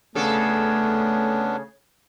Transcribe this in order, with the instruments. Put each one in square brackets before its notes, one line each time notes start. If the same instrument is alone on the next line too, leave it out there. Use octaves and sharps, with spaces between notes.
[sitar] C#3 A4 [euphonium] A3 [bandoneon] B3 C#4 D4